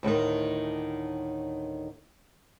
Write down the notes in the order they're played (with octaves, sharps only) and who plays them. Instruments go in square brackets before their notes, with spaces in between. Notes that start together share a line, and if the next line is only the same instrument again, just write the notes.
[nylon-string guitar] D2 A2 D3 D#3